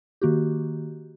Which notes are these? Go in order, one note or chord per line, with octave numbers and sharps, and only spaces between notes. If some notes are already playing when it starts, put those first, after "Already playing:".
D#3 A#3 F#4 G4